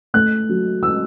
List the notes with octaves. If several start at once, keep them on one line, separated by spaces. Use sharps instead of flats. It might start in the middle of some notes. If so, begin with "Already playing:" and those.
A3 F#6
F#3
E6